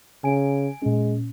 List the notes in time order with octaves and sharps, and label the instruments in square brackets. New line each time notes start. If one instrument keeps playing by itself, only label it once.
[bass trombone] C#3 [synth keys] G#5 D7
[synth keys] A#2 C#4 [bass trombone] G#3